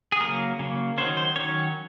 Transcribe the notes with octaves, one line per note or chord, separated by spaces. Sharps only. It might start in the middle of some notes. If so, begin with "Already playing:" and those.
G#4
C#3 F#3 A#3 A#4
C#3 F#3 A#3
D#3 F#3 C#4 C5
C5
D#3 F#3 C#4 C#5